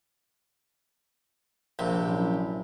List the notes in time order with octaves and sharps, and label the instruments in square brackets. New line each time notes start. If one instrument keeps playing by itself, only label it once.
[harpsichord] A#1 C3
[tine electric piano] F#3 C#4 E4